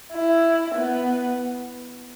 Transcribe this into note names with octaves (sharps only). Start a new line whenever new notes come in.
E4
B3